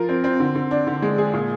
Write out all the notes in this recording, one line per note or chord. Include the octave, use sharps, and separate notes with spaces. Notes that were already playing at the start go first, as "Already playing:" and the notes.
Already playing: F3 F4 A#4
C4
C4
D3
D3
D4
D3
G#3
G#4
A#2